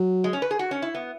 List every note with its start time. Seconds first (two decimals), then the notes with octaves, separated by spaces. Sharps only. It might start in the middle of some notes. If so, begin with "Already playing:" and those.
Already playing: F#3
0.24 G#3
0.33 C#4
0.42 B4
0.51 G#4
0.59 F#4
0.71 C#4
0.82 E4
0.94 B3